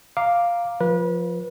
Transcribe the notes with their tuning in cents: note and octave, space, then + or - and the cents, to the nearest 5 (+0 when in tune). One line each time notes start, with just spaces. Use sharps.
F5 +0 A#5 +0 D6 +0
F3 +5 B4 -30